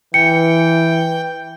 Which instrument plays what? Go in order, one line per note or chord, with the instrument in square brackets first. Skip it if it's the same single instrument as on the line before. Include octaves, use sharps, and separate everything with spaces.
[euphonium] E3 [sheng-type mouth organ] G5 [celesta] C#7